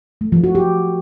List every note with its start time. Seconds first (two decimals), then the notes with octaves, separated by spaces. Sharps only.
0.21 A3
0.32 F3
0.44 F#4
0.55 G4